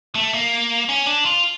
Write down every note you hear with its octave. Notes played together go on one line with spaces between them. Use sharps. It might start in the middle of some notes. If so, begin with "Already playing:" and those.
A3
A#3
C#4
D4
F4